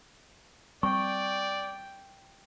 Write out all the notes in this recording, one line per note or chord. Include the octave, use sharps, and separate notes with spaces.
G3 C4 D5 G5 C#6